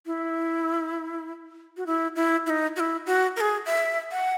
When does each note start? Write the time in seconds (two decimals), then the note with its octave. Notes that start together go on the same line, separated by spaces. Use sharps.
0.06 E4
1.77 F#4
1.86 E4
2.16 E4
2.46 E4
2.50 D#4
2.76 F#4
2.80 E4
3.06 F#4
3.36 A#4
3.41 G#4
3.66 E5
4.12 F#5